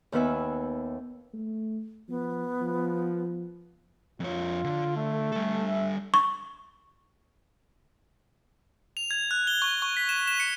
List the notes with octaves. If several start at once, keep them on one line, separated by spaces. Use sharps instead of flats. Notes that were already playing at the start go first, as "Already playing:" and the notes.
D#2 D#3 B3 B4 E5 G#5
A3
F3 B3
F3
F2 F4 C#5
D3
A3
G3 A4
E5
C#6
F7
G#6
F#6
G7
C#6
C#6
B6
E7
E7
C#7